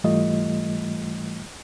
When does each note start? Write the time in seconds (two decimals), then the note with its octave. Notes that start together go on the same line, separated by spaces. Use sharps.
0.04 G#2 E3 G3 A3 F4 D#5